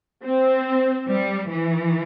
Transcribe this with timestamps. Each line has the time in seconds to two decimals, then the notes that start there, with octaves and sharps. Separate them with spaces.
0.25 C4
1.08 G3
1.51 E3